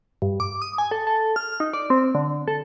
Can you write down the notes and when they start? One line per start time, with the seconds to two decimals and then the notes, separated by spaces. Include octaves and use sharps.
0.22 G2
0.40 D6
0.62 D#6
0.78 G#5
0.91 A4
1.07 A4
1.36 F6
1.60 D#4
1.73 D5
1.90 C4
2.15 D3
2.48 A4